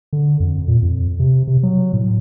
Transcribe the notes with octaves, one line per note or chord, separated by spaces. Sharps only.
D3
F2
A#2
F2
C3
C3
F#3
A2